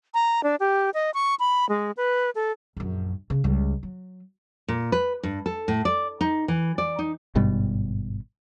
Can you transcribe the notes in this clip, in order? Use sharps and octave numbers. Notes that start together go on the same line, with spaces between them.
A#5
D4
G4
D#5
C#6
B5
G#3
B4
A4
A#1 F#2
C#3
C#2 G3
F#3
A#2
B4
G2
A4
A2
D5
D#4
E3
D5
D#4
G#1 G2 B2 G3